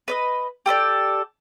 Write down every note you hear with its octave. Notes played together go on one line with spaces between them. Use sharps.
B4 D5 D#5
G4 A4 B4 D5